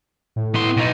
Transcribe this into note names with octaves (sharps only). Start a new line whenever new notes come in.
A2
B3 C6
B2 D#4